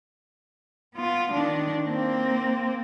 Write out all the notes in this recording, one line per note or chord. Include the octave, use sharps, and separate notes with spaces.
B3 F4
D#3 D4
A#3 C4